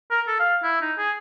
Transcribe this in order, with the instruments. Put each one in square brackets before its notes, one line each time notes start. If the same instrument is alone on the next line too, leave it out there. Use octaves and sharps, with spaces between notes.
[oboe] A#4
A4
F5
E4
D#4
G#4